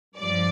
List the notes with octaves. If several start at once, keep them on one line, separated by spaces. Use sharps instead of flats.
G2 F3 D5